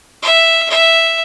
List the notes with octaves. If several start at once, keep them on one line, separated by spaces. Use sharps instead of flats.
E5
E5